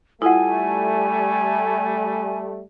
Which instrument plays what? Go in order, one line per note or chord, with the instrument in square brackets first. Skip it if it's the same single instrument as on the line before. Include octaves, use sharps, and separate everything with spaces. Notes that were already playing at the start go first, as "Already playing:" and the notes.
[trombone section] G3 A3 [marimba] E4 F4 [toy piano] A4 F#5 [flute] G#5